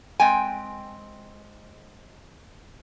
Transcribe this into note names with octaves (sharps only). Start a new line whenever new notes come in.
G#3 C4 G5 G#5